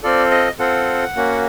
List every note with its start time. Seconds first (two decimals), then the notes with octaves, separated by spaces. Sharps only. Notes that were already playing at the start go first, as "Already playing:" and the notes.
0.03 C4 F4 A4 D5
0.31 D#5
0.59 C4 F4 A4 F#5
1.16 A#3 C#4 F#4